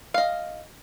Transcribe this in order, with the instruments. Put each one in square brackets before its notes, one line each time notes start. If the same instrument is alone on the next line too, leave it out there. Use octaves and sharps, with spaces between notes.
[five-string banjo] D#5 F5